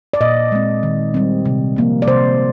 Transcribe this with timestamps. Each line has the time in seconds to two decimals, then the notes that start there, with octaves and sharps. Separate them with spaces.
0.13 D5
0.21 A#2 D#5
0.52 G#3 C4
0.83 D#3
1.14 G3 C4
1.46 C3
1.77 F3 A#3
2.02 D5
2.07 C3 C5